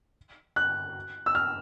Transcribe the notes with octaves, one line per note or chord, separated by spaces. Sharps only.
F#6
E6
F6